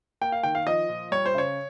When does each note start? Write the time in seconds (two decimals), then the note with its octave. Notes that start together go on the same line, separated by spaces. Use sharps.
0.21 A#3 G5
0.32 F5
0.43 D#3 G5
0.55 F5
0.67 F3 D#5
0.89 A#2
1.12 G3 C#5
1.26 C5
1.34 C#3 C#5